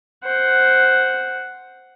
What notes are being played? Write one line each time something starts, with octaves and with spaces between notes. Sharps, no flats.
C5 F#5